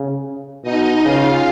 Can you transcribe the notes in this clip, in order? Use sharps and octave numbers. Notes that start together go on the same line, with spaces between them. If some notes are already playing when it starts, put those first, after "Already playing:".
Already playing: C#3
B2 D#4 D#5
C#3 F4 F5